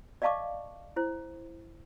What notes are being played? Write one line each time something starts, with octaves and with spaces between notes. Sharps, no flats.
D5 D#5 F5 A5 C#6 D6
E4 C5